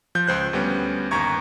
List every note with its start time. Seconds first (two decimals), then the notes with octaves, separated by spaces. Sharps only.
0.15 F3 G6
0.27 C#2 C5 F#6
0.53 D2 G3 B3 C#4
1.11 G1 D#2 A#5 C#6 G#6